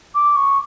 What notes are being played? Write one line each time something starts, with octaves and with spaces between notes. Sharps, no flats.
D6
C#6